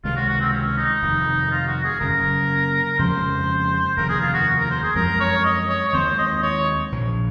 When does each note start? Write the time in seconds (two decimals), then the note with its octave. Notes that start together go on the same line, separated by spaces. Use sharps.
0.04 C#2 C3 D#3 G#3 F4
0.16 F#4
0.28 F#4
0.41 C4
0.53 C#4
0.77 D#4
1.02 F1 F2 D#3
1.51 F4
1.67 F#4
1.84 G#4
2.00 F#1 F#2 C#3 F#3 A#4
2.99 F2 C#3 F3 G#3 C5
3.97 F1 D#2 C#3 A#4
4.09 G#4
4.21 F4
4.33 F#4
4.59 A#4
4.71 C5
4.83 G#4
4.95 F#2 F3 G#3 C4 A#4
5.20 C#5
5.44 D#5
5.69 C#5
5.88 C#5
5.93 D#2 D#3 G#3 C4 C5
6.18 D#5
6.42 C#5
6.92 A#1 A#2 F3